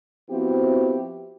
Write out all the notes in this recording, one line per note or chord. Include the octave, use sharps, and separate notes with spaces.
F3 B3 C4 E4 F#4 G4